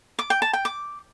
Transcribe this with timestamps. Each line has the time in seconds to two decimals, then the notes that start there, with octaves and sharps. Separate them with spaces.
0.19 D6
0.30 G5
0.42 A5
0.53 G5
0.65 D6